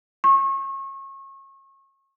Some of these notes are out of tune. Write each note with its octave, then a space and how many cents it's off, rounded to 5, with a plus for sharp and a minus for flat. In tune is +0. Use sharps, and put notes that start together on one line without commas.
C#6 -30